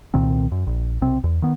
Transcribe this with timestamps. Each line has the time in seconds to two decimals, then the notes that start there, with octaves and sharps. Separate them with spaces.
0.14 C2 A#2 D#3 C4
0.52 F#2
0.67 A#1
1.01 B1 C3 C4
1.24 E2
1.42 D#3 B3